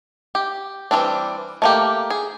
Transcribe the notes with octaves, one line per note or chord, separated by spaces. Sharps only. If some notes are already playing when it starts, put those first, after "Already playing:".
G4
E3 F#3 G3 C4 D4
A3 A#3 G4
G#4